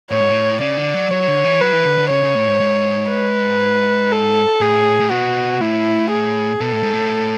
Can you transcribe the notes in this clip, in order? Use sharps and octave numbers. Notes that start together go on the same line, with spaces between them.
A2 C#5
G#2
A2
C#3 D5
D3
F#3
F#3 C#5
D3
E3
F#3 B4
E3
D3
D3
C#3 C#5
C#3
A2
G#2
G#2
B4
A4
A2 G#4
A2
B2 F#4
A2 E4
G#4
B2 A4
A2
G#2
A2